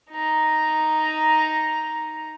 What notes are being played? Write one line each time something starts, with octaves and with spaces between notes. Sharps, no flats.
D#4 A#5